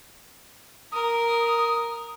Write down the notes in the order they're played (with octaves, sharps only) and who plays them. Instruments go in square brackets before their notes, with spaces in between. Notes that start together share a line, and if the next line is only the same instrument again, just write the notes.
[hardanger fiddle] A#4 [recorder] D#6